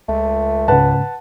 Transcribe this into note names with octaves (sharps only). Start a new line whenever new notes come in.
C#2 A3
G#2 C#3 B4 F#5 A5